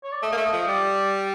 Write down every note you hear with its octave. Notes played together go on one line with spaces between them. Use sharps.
C#5
D5
A3 D#5
A#3
A3
D#5
F3
G3 D5